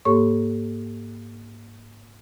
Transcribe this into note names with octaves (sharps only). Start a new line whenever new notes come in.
G#2 A#3 G4 A4 C#5 C#6